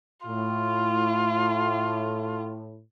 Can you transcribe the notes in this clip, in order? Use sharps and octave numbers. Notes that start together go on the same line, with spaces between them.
A2 F4